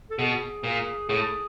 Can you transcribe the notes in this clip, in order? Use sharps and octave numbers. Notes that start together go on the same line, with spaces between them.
A4
B2 G#4
A#2
A2 G#4